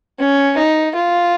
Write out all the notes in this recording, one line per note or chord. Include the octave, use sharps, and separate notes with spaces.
C#4
D#4
F4